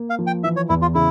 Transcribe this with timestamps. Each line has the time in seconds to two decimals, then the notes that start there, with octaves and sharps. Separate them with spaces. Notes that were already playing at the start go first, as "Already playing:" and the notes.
Already playing: A#3
0.10 F5
0.19 F3
0.27 G5
0.44 E3 E5
0.56 C#5
0.69 E2 E4
0.82 F4
0.95 C#3 E4